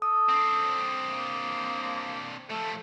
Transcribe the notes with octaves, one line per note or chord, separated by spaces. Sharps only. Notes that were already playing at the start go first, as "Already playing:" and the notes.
A4 D#6
C4 D4
A#3
F3 A3 A4